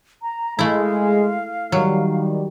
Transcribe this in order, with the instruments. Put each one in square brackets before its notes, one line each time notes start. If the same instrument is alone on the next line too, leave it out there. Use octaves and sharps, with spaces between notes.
[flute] A#5
[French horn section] G#3 [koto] A3 E4 [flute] F5
[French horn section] D#3 G3 [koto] F#3